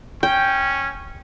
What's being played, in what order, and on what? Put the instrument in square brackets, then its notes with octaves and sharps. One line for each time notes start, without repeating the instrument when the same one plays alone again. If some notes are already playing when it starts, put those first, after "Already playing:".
[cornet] C#4 [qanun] G5